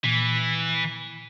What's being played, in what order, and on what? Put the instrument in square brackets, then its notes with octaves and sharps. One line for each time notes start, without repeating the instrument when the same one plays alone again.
[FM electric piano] A#2 [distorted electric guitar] E3